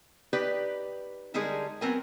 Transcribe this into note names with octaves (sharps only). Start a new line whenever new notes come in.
D#4 G4 B4 D5
D3 G3 G#3 D#4 G#4 A#4
F#3 B3 C4 A#4 G#5